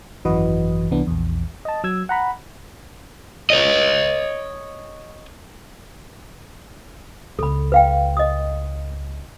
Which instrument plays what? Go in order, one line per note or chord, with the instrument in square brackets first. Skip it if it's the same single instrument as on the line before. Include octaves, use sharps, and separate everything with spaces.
[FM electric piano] G#1 F#2 E3 F#4 B4 D#5
C2 E3 B3 D4
A#1 E2
D#5 A5
F#3 E6 G#6
F#5 A#5 B5
[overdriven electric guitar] C#5 D#5
[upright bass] C#2 [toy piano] A4 B5
[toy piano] B4 F5 G5
D#5 D#6